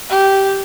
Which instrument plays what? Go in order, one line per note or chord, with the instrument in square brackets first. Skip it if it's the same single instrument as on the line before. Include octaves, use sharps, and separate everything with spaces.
[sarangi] G4